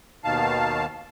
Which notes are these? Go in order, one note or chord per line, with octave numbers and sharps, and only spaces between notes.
D#2 B2 D#3 F5 A5